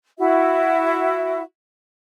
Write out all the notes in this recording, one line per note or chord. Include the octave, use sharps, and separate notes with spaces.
E4 F#4 E5